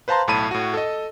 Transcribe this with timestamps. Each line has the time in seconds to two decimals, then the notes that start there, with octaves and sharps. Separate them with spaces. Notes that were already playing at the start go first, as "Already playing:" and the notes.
0.08 B4 C5 F5 A5 A#5 C6
0.27 B1 A2 A5 B5 D#7
0.51 A2 F#4
0.74 A4 D#5